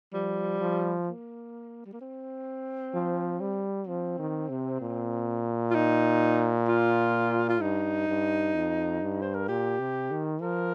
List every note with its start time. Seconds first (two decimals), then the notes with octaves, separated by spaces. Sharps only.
0.14 F3 G3
0.60 F3
1.07 A#3
1.86 G3
1.93 A#3
2.01 C4
2.94 F3
3.40 G3
3.87 F3 C4
4.19 D#3
4.49 C3
4.81 A#2
5.71 F4
5.75 D#4
6.68 F4
7.49 F4
7.61 G2 D#4
8.08 G2
8.55 F2
9.02 G2
9.21 C5
9.34 A#4
9.48 A#2 G4
9.79 C3
10.11 D#3
10.41 F3 A#4